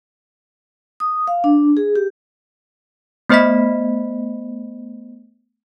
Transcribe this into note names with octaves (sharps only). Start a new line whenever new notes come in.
D#6
F5
D4
G#4
G4
A3 B3 C5 D#5 B5 B6